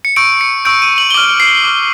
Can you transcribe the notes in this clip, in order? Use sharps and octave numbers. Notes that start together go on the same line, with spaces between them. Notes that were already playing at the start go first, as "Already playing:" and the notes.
C#7
C#6 E6 G6 D7
C#7
C#6 E6 G6 D7
D#7
F#7
G7
D6 F6 F#7
C7
D6 F6